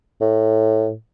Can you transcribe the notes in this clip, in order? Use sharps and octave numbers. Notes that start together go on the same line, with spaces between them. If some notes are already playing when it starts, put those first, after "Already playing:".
A2